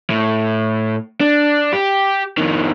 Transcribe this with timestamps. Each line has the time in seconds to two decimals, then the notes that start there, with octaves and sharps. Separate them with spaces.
0.10 A2
1.21 D4
1.73 G4
2.38 F2 D#3